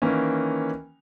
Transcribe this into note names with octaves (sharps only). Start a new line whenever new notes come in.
D#3 E3 A#3 C#4